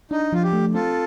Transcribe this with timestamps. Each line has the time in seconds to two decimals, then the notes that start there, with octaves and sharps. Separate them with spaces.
0.11 D4 D#4
0.33 F3 F4
0.43 G4
0.53 A3
0.74 C4 F4 A4